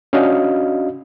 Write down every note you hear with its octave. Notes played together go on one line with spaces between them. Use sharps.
C#4 D4 F#4 D#5 F5